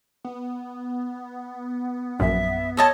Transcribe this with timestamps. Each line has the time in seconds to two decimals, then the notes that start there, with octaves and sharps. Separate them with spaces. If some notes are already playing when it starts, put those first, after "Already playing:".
0.24 B3
2.20 A#1 F#2 E5
2.77 A4 C#5 D#5 A5